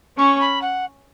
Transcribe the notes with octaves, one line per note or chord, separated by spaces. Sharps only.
C#4 C#6
B5
F#5